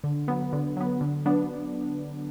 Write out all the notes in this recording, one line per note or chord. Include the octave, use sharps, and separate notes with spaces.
D3
F#3 B3
D3
F#3 B3
D3
F#3 B3 D4